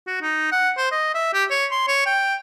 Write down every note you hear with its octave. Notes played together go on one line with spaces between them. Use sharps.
F#4
D#4
F#5
C5
D#5
E5
G4
C#5
C6
C#5
G5